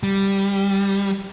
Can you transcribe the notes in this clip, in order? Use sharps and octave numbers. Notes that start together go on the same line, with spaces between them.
G3